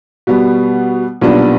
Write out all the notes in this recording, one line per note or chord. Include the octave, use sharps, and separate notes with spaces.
B2 G3 B3
B1 A#2 G3 B3 D4